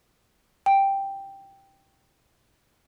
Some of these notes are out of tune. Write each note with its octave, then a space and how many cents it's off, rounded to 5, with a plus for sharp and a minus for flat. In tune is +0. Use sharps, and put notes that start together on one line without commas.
G5 +0